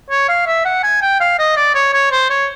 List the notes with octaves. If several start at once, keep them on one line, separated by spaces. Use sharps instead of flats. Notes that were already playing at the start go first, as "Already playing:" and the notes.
C#5
F5
E5
F#5
G#5
G5
F5
D#5
D5
C#5
C#5
C5
C#5